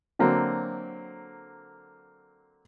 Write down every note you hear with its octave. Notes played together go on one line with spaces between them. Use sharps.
D3 F#3 A#3 C4